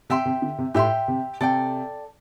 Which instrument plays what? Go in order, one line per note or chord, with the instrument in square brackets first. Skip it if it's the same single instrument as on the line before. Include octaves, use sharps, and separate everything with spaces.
[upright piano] C3 [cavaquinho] G4 E5 G5 C6
[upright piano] C3
D3
C3
[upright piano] A2 [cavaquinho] G4 E5 G5 C6
[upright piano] C3
[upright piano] C3 [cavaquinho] A4 D5 G5